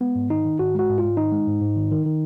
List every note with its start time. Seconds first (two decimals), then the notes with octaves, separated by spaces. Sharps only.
0.01 G#3 B3
0.15 G#2
0.30 D#3 D#4
0.45 D#3
0.59 G#2 F#4
0.74 G#3 F#4
0.89 G#2
0.98 F4
1.03 G#2
1.17 D#3 D#4
1.32 G#3
1.47 G#2
1.61 G#2
1.76 D#3
1.92 D#3
2.06 D#3